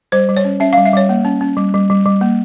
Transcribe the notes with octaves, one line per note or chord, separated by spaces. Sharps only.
G3 C5
G3
C#5
C#4
C#4 E5
G3 F5
E5
G3 C#5
A#3
C#4
C#4
G3
G3
G3
G3
A#3